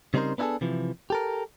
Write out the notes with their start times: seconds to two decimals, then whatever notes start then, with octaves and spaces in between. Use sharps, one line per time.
0.14 C#3 G3 C4 D#4 A#4 C5
0.38 B3 D4 E4 F#4 G#4 A4
0.61 C3 E3 F3
1.10 G4 A4 A#4